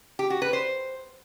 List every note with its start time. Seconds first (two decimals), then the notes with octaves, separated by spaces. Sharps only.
0.19 G4
0.30 F#4
0.42 B4
0.53 C5